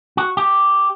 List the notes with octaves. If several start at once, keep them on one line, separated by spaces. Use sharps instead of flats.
F#4
G4